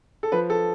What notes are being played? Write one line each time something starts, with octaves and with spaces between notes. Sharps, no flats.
A4
F3 B4
A4